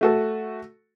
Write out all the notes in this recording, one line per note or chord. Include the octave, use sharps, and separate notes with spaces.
A3 F#4 A4